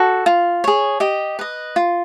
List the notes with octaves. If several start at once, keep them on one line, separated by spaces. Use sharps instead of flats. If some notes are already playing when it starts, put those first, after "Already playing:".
Already playing: F#4 A4
F4
G#4 C#5
G4 D#5
B4 D#5
F4